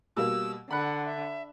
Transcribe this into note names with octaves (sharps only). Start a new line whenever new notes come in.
B2 G3 A#3 E6
D3 F#5 B5 F#6
E5